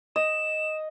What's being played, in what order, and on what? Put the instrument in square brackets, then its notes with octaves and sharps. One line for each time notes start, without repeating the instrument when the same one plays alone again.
[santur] D#5 [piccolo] E7